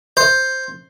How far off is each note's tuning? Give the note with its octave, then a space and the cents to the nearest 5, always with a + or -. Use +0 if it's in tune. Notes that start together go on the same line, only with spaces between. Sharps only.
C5 +5